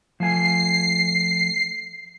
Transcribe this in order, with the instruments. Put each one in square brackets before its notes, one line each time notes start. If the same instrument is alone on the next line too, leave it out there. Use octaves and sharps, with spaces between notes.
[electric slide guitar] F3 A3 G#5 [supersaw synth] C7